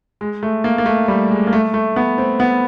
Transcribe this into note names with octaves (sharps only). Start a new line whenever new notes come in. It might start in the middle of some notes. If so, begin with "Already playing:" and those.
G#3
A3
A#3
A#3
A3
G3
G#3
A#3
A3
A3
B3
C4
B3